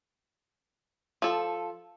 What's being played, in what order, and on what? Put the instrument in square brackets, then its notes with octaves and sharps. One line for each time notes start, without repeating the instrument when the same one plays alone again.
[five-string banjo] F3 A4